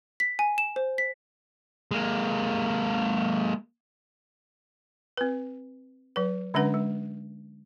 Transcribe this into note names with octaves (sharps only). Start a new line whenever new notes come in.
B6
G#5
E7
C5
B6
G#3 A#3
C4 B4
F#3 B4
D3 G#3 C#4 D4 B4 F#5
G#3